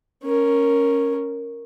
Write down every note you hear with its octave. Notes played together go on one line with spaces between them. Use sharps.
C#4 A#4